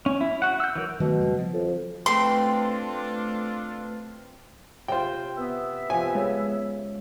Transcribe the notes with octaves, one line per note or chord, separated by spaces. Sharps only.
C#4
E4
F#4 F#5
E6 G6
E3 F#3 A#4
B2 D#3 F#3 A3
F2 C#3 G3
F3
F2
A3 C4 D4 F4 A4 B4 C6
C3 F4 C5 G5
B3 E5
C3 F3 G#5
C#3 G#3